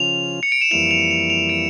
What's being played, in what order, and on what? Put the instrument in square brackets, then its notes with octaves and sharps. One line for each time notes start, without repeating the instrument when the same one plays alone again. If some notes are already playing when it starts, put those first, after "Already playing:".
Already playing: [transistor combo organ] C#3 F3 C#4 F4 [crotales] F7
[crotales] C#7
D7
E7
[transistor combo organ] F2 E3 G3 A#3 E4 [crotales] F7
[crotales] F7
F7
F7
D7